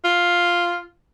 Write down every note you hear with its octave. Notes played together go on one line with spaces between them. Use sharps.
F4